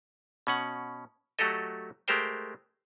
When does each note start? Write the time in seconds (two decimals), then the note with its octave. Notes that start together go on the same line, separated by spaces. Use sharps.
0.47 B2 C#4 F#5
1.39 F#3 A3 F#4 G4 A4 D#5
2.08 G#3 A3 G4 A#4 C5 G5